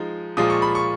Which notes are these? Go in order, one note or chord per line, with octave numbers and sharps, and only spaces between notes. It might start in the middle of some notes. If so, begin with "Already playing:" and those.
Already playing: F3 G#3 D#4
A#2 F3 G#3 D#6
C#6
B5
C#6